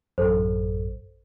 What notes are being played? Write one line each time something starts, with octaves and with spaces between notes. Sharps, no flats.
A1 F#2 A4 C5